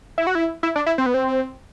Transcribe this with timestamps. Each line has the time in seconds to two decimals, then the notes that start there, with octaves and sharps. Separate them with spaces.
0.18 E4
0.27 F#4
0.35 E4
0.63 E4
0.76 D4
0.86 E4
0.98 C4
1.06 B3
1.14 C4